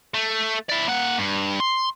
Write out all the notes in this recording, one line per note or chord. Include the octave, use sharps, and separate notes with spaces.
A3
E4 D5
A#3 F#5
G2
C6